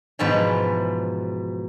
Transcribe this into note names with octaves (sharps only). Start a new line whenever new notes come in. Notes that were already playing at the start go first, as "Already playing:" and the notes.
E2 G#2 B2 F3 F4 B4